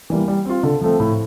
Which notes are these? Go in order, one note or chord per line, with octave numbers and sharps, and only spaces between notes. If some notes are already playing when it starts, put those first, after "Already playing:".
E3 G3 A#3
G3
C4 F4
D3
F3 A3 C4
A2